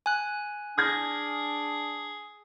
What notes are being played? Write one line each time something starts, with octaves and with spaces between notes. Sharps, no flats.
G#5 F#6
D4 G#4 F6 G#6 A#6